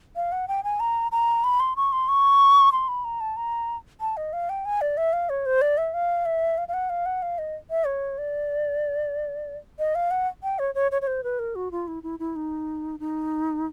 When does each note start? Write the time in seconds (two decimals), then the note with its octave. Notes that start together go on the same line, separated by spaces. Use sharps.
0.16 F5
0.32 F#5
0.48 G5
0.64 G#5
0.80 A#5
1.12 A#5
1.44 B5
1.60 C6
1.76 C#6
1.92 C6
2.08 C#6
2.73 C6
2.88 B5
3.05 A#5
3.21 A5
3.37 A#5
4.01 A5
4.17 D#5
4.33 F5
4.49 G5
4.65 G#5
4.81 D5
4.97 E5
5.13 F5
5.29 C#5
5.46 C5
5.61 D5
5.78 E5
5.94 F5
6.26 E5
6.58 F5
6.68 F5
6.74 F#5
6.90 F5
7.06 F#5
7.22 F5
7.38 D#5
7.70 E5
7.86 C#5
8.18 D5
9.79 D#5
9.95 F5
10.11 F#5
10.43 G5
10.59 C#5
10.75 C#5
10.92 C#5
11.02 C#5
11.07 C5
11.24 B4
11.39 A#4
11.55 F#4
11.71 F4
11.88 E4
12.03 E4
12.19 E4
12.36 D#4
13.00 D#4